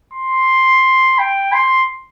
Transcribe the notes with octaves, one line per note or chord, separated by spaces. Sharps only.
C6
G5
C6